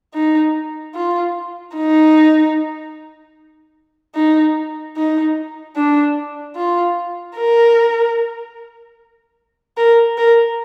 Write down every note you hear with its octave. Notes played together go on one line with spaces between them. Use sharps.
D#4
F4
D#4
D#4
D#4
D4
F4
A#4
A#4
A#4